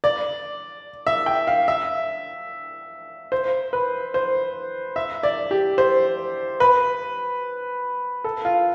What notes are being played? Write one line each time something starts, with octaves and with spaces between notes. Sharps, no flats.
D5
E5
G5
F5
E5
C5
B4
C5
E5
D5
G4
C5
B4
A4
F4